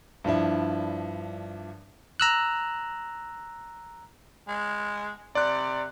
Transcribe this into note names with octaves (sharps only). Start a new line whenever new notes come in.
G2 F3 D4 E4
A#5 E6 F#6
G#3
C3 D5 F#6